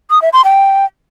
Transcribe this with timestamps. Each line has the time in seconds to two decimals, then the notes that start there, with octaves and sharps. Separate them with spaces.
0.10 D#6
0.22 E5
0.33 C6
0.44 G5